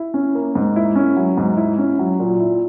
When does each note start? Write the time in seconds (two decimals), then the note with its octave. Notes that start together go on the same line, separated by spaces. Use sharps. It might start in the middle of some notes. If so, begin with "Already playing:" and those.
Already playing: E4
0.14 C#4
0.35 A#3
0.55 G#2
0.76 E4
0.96 C#4
1.16 F#3
1.37 G#2
1.57 E4
1.78 C#4
1.99 F#3
2.19 A#2
2.40 E4